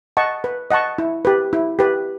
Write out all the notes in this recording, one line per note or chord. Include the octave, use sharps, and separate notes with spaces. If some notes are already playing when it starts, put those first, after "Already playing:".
D#5 F#5 A5 C#6
B4
D#5 F#5 A5 C#6
E4
G4 B4
E4
G4 B4